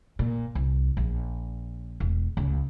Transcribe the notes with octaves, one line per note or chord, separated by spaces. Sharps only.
A#2
C2
A#1
E1
C#2